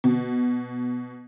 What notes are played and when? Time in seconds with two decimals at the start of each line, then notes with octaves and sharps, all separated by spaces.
0.04 B2